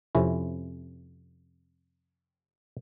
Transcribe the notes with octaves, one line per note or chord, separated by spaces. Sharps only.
F2 C3 C#4 E4